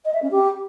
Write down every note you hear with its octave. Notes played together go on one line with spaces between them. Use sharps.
D#5
E5
C#4
G4